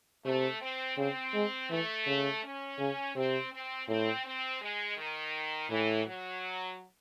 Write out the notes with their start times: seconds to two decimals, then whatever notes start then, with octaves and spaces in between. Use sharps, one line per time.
0.25 C3 A3
0.61 C4
0.97 C#3 C4
1.34 G#3
1.70 E3 A3
2.06 C#3
2.43 C#4
2.79 C#3
3.15 C3 C4
3.52 C4
3.87 A2 C4
4.25 C4
4.61 G#3
4.97 D#3
5.70 A2 E3
6.06 F#3